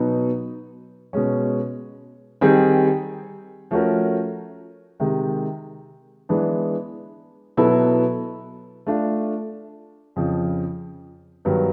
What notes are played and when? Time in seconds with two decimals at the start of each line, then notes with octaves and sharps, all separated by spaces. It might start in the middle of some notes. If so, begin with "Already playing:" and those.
Already playing: B2 F#3 B3 D#4
1.13 B2 G#3 C#4
2.41 D#3 G3 C4 D#4 G#4
3.71 F3 A3 C#4 F#4 A#4
5.00 C3 D#3 G#3
6.29 E3 G#3 B3 D4
7.57 B2 F#3 B3 E4 A4
8.87 A3 D4 F4
10.16 F2 C#3 F3
11.45 G2 D#3 F#3 B3